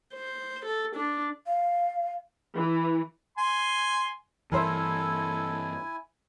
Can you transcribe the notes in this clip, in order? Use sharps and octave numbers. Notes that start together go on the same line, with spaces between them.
C5
A4
D4
F5
E3
G#5 C6
G2 E3 E4 A4 A#4 C5 E5 G#5